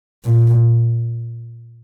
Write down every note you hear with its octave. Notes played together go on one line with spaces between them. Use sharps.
A#2